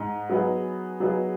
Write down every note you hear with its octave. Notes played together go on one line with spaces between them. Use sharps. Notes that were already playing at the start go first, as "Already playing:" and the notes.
Already playing: G#2 G#3 D#4
F#3 B3 D#4 G#4
F#3 B3 D#4 G#4